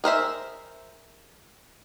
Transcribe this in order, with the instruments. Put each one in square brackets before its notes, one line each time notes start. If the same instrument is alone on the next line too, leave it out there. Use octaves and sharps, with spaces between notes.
[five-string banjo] G#4 A#4 C5 E5